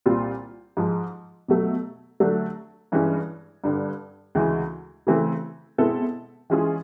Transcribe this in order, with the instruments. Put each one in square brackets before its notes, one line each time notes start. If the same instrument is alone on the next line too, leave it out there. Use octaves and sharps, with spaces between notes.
[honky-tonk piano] C2 A#2 G3 C4 F4
G#2 F3 G#3
B2 F#3 A3
D3 F#3 A3 D4
G2 E3 G#3 C#4
G2 D3 G3
D2 C#3 E3 G#3
C#3 E3 A3 C4
B2 G#3 C4 E4 A4
E3 G#3 C#4 F4 G#4